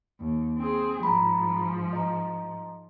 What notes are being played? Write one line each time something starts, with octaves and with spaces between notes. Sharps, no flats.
D#2
C4 G#4
G#2 F3 A#5 B5
D#5 A#5